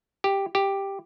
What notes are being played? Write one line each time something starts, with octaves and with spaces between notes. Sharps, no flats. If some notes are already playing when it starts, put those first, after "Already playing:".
G4
G4